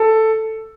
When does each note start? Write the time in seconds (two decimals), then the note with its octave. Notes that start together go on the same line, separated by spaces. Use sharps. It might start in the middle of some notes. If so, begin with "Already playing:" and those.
Already playing: A4